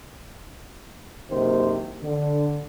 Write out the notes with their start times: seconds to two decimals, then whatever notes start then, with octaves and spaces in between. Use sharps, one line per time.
1.30 F#1 C3 D#3 A#3 C5
2.03 D3